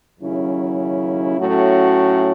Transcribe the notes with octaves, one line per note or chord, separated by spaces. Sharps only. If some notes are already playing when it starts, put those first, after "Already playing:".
D#2 C#3 F#3 C#4 E4
A2 F#3 A3 C#4 F#4